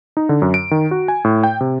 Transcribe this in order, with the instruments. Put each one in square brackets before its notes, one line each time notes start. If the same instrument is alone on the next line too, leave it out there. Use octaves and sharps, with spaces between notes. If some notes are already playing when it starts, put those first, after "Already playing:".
[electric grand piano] D#4
D3
F#2
D7
D#3
F#4
G#5
A2
G5
C3